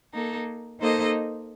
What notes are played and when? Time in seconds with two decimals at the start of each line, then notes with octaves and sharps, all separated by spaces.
0.13 A#3 D#4 A4
0.80 A#3 D#4 A4 C5 D#5